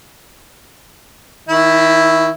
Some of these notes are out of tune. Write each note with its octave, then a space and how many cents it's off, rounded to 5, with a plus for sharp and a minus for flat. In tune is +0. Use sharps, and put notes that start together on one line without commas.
D#3 +30 E4 +0